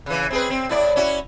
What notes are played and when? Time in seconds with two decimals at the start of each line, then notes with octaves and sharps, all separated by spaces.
0.06 C#3 E3
0.31 C4 G#4 B4
0.50 C4
0.69 A2 E4 D5
0.96 C#4 E4 F#4